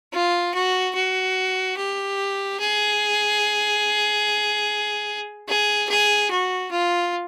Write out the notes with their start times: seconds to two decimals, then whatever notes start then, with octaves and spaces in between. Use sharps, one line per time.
0.13 F4
0.54 F#4
0.95 F#4
1.78 G4
2.60 G#4
5.48 G#4
5.89 G#4
6.31 F#4
6.71 F4